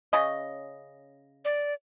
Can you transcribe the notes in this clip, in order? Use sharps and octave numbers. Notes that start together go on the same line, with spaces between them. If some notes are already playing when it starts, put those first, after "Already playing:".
C#3 C#4 D#5
D5